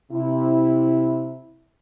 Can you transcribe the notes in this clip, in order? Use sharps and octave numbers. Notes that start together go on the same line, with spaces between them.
C3 E4